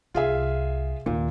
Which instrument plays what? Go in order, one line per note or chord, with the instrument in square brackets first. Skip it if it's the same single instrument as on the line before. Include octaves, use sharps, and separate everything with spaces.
[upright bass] C2 [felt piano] F4 G#4 E5
[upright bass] D#2 [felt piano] A#2